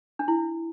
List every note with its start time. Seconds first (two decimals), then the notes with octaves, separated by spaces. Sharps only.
0.19 D4
0.28 E4